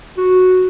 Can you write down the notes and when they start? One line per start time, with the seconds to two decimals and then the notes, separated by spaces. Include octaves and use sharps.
0.18 F#4